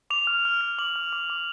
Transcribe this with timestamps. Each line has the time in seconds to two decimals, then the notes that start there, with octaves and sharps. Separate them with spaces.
0.10 D6 F7
0.27 F6
0.45 F6
0.61 F6
0.78 D6 F#7
0.96 F6
1.13 D6
1.30 D6